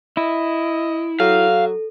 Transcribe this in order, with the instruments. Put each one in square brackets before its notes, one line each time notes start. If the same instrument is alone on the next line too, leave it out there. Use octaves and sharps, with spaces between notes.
[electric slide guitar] E4 [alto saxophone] D#5
[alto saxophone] F#3 [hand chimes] A4 [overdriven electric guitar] F5